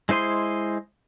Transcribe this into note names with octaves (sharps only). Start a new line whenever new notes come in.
G#3 E4 C5 D#5 C6